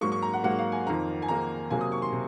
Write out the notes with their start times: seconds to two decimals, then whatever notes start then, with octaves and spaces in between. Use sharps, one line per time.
0.01 G#2 F#3 A#3 C#6
0.12 C#6
0.22 A#5
0.34 F#5
0.44 G#2 F#3 A#3 F#5
0.59 F5
0.72 G#5
0.86 F2 D#3 A#3 A#5
1.22 G#5
1.28 F2 D#3 A#3 A#5
1.71 C3 F#3 A#3 G#5
1.81 D#6
1.92 C#6
2.02 C6
2.13 C3